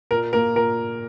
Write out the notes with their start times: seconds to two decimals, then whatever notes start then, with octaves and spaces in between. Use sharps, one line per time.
0.11 A#2 A#4
0.33 A#3 A#4
0.55 A#2 A#4